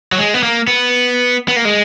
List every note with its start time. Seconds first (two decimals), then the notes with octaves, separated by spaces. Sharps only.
0.12 F#3
0.18 G#3
0.34 B3
0.43 A#3
0.68 B3
1.48 B3
1.56 A#3
1.65 G#3